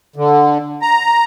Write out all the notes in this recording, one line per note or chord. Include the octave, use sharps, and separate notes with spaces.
D3
A#5